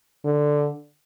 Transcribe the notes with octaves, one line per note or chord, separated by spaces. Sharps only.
D3